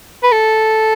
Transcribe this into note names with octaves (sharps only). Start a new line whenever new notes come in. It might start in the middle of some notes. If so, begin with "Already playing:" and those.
B4
A4